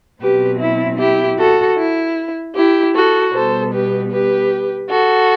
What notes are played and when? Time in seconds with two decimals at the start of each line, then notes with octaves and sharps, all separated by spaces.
0.20 B2 F#3 C4 G4 B4
0.59 E4
0.98 E4 G4
1.37 F#4 A4
1.77 E4
2.55 E4 G4
2.95 F#4 A4
3.33 B2 G3 B3 A4 C5
3.72 G4 B4
4.11 G4 B4
4.89 F#4 A4